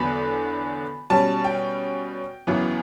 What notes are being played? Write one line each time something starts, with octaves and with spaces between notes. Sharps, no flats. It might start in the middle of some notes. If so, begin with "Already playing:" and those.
Already playing: E2 D3 F#3 B3 B5
B2 G3 C#4 A5
G5
F#2 C#3 E3 B3